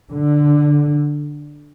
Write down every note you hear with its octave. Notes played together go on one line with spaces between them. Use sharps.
D3